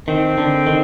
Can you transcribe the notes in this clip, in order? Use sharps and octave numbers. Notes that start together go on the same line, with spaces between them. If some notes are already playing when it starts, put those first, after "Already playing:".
D#3 C4
D3
D#3